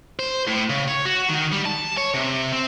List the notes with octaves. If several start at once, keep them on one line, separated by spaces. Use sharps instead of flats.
C5
A2
C#3
C#5
F#4
D#3
G3
A5
C#5
C3
C4